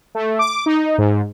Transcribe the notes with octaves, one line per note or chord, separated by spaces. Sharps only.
A3
D6
D#4
G#2